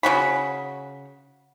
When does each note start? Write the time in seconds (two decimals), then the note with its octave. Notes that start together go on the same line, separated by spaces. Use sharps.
0.03 C#3 F#3 F#4 B5